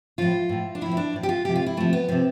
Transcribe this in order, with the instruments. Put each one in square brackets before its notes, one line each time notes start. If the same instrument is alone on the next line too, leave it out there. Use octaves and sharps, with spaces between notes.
[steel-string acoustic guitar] A2 F3 F4
A2 F3
D4
A2 F3 E4
C4
D4
A2 F3
G4
F4
C3 F3 G4
F4
E4
C3 F3 A3
B3
C3 F3 C4